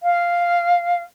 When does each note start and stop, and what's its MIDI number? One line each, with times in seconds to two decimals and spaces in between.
0.02 1.02 77